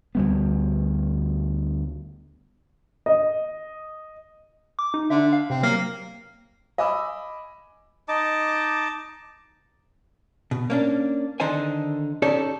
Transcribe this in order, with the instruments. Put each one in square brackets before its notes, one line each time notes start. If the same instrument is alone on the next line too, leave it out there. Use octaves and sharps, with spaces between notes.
[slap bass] D2 G3 B3
[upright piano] D#5
[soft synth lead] D6
D#4
[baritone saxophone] D3 [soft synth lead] E5
[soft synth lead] F5
[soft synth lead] C3 [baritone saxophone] C4
[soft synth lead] F#3 [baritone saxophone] A#3
[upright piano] D#5 G#5 B5 D6 E6
[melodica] D#4 D#5 A5 D6
[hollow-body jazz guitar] B2
A#3 C#4 D4
D3 D#3 D#4 A4 C5 G#5
C#4 D#4 G4 A4 C#5 D5